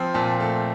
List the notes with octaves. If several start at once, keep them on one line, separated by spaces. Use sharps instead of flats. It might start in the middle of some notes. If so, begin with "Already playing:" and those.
Already playing: F3 C4
A#2 A5
A3